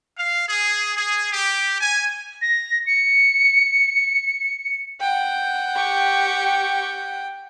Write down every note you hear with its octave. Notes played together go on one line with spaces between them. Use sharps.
F5
G#4
G#4
G4
G#5
A#6
C#7
F#5 G5
G4 C#6